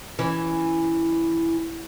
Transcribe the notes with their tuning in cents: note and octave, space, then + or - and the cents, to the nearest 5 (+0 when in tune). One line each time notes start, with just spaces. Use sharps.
E3 +0 C#4 +0